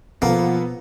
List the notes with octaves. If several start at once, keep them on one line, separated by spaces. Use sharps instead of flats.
B2 F3 A#3 B3 A4